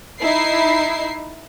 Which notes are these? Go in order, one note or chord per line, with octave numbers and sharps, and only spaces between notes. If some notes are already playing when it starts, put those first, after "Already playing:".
D#4 E4 C7